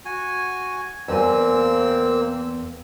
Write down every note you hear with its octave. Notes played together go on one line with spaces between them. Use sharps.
F#4 G#5
E2 A#3 C4 G#5 E6